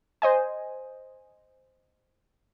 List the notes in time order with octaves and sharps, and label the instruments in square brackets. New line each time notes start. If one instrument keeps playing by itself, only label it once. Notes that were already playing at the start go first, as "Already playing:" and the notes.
[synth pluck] C5 D#5 G#5